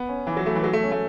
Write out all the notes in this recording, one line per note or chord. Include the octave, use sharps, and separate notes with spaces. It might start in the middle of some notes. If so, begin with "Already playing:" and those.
Already playing: B3
C#4
E3
F#3
A3
E3
F#3
A3
C#4
A3